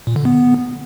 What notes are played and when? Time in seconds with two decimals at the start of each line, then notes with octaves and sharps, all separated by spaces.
0.07 A#2
0.16 D3
0.25 B3